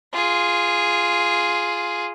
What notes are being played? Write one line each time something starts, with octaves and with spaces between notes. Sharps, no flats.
F4 G#4